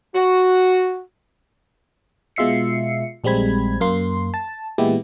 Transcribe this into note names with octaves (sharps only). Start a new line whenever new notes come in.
F#4
B2 G#3 F4 E5 C7 C#7
A#1 G3 G#3 C4 B5 G#6
F#2 A#3 C6
A5
A#2 E3 G#3 B3 E4 G4